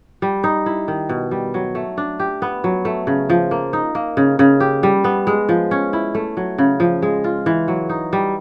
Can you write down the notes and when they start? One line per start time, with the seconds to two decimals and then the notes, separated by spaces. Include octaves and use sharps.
0.22 G3
0.44 D#4
0.66 E4
0.88 D#3
1.09 B2
1.31 G3
1.54 F#3
1.75 A3
1.98 D4
2.20 G4
2.42 B3
2.64 F#3
2.85 A3
3.07 C#3
3.30 F3
3.51 A#3
3.73 D#4
3.95 A#3
4.17 C#3
4.39 C#3
4.60 G4
4.83 G3
5.04 B3
5.27 G#3
5.49 F3
5.71 C#4
5.93 E4
6.15 A3
6.37 F#3
6.58 C#3
6.80 F3
7.02 G#3
7.24 F4
7.46 E3
7.68 F#3
7.90 D#4
8.13 G3